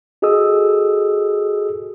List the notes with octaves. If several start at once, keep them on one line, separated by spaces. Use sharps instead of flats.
F#4 G#4 A4 D#5 D#6 E6